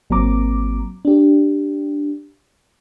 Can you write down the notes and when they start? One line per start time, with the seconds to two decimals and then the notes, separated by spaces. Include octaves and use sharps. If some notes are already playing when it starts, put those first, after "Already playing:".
0.10 G#1 F#3 A#3 C4 A#5 D6
1.05 D4 G4